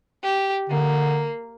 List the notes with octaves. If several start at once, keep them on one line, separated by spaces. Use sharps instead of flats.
G4
D3 A#3